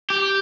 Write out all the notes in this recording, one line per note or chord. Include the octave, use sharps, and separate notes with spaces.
G4